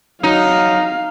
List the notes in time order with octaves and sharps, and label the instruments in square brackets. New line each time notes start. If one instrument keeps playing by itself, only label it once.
[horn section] F#3 [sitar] D#4 [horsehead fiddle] F5